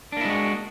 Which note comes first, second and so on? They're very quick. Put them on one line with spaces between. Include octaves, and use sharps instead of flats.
D4 A#3 E4 G#3 F#4